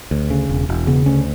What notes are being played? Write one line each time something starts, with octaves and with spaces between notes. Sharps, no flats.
D2
C#3
E1
E1
C#3 B3
D2 C#4